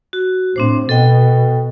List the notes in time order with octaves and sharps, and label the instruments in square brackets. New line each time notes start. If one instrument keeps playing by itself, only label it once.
[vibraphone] F#4
[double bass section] A2 [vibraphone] C4 D4 C5
[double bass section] B2 [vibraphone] A4 D#5 G5